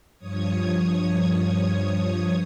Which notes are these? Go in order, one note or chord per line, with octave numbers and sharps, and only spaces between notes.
G2 F3 C#5 D#6 G#6